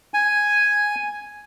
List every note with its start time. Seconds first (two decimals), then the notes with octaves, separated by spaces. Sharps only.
0.14 G#5